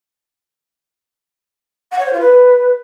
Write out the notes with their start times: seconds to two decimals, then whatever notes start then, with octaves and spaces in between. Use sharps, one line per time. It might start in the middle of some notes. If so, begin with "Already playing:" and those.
1.91 F#5
1.98 C#5
2.05 C5
2.12 F4
2.20 B4